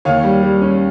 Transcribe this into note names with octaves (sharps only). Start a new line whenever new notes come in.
D#2 C#5 F5
G3
G3
C#4